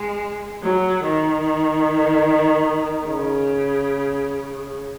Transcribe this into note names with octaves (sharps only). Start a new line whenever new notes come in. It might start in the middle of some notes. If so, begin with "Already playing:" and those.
Already playing: G#3
F#3
D#3
C#3